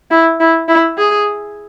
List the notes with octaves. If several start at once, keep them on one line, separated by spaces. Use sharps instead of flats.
E4
E4
E4
G#4